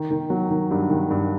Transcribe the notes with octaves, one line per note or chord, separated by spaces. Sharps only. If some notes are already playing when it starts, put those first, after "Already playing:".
Already playing: D#3
D#3
F#3
D#3
G2
D#3
G2